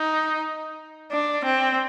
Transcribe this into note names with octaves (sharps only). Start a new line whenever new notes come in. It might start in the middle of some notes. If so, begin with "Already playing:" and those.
Already playing: D#4
D4
C4